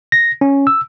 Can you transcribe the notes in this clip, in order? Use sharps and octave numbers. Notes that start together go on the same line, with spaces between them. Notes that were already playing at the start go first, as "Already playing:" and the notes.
A#6
C#4
E6